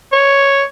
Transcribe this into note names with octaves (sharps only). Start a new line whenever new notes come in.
C#5